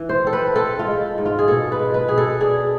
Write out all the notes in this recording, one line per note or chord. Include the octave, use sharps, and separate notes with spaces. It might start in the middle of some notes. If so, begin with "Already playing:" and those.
Already playing: E3
C5
C4 A4
B4
C4 A4
F4
G#3
G#2
F4
G#4
B2 A4
B4
G#3
B4
B2 G#4
A4
D4 G#4